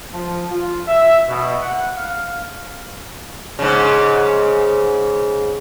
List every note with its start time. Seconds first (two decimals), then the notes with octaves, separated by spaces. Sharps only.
0.12 F3
0.50 F4
0.87 E5
1.28 B2
1.62 F#5
1.97 F5
3.59 G#2 C#3